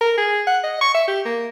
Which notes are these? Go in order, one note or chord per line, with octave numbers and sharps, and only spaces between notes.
A#4
G#4
F#5
D#5
C#6
E5
G4
A#3